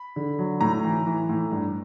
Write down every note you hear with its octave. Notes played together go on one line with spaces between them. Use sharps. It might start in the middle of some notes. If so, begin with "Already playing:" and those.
Already playing: B5
D3
F#3
A2 A#5
E3
E3
A2
G2